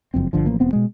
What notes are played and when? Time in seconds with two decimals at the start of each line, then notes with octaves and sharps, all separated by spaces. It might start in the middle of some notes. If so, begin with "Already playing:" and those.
0.14 F#1 F2 C4
0.33 G1 D3 F3
0.46 A1 F3 A#3
0.60 E1 B3 C4
0.73 B2 G#3